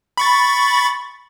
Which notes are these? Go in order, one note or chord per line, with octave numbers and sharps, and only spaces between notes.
B5 C#6 A6